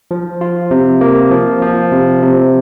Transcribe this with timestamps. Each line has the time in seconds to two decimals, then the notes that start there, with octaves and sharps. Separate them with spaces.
0.11 F3
0.41 F4
0.71 C3
1.01 A#3
1.31 F3
1.62 F3
1.92 C3
2.22 C3